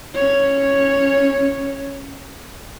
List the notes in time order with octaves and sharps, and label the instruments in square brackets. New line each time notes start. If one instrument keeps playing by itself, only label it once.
[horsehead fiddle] C#4 C#5